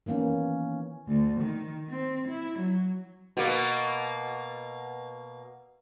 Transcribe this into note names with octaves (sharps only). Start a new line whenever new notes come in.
D#3 E3 A#3 B3 C#4
D2
D#3
C4
E4
F#3
B2 A#3